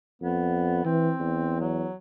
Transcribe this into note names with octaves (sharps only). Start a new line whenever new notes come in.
F2 B3
E3 C4
E2
F#3